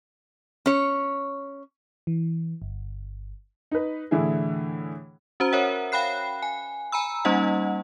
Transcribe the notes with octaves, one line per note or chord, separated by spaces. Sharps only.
C#4 C#5
E3
G1
D#4 B4
A2 D3 E3 E4 G#4
C#4 F#4 C5 A#5
A#4 C#5 E5 F#5
F5 G5 B5 F#6 C7
G#5
G#5 A#5 B5 E6
G3 A#3 C#4 D#4 D#5 F#5